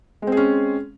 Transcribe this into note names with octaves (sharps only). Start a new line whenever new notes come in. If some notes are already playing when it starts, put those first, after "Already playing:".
G#3 C4 C#4 G#4